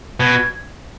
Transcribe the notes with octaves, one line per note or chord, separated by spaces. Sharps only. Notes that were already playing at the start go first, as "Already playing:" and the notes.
B2 G#6